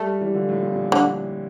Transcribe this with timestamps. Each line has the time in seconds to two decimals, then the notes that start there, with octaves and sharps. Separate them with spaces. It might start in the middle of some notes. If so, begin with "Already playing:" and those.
Already playing: G3 A3
0.21 E3 G3
0.34 D3 F3
0.49 A2
0.62 A#2
0.75 A#2
0.89 A2 D3